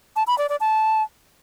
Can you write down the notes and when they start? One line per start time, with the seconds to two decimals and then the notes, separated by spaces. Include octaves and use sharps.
0.16 A5
0.27 B5
0.38 D5
0.49 D5
0.60 A5